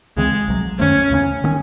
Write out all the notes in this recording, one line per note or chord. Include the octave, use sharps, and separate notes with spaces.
C#2 C#3 E3 G#3 C4
C2 C3 F#3
F#2 D#3 A3 C#4
D#2 C#3 G#3 C#4
D#3 A3 C#4